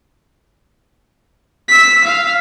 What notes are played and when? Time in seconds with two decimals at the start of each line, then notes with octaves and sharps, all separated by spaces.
1.68 E6 B6
2.04 F5